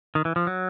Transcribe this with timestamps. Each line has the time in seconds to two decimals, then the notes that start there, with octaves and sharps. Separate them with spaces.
0.15 D#3
0.25 E3
0.36 F3
0.47 F#3